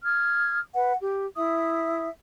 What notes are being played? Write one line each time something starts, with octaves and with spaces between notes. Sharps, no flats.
D#6 F6 G#6
B4 F#5
G4
E4 E5 D#6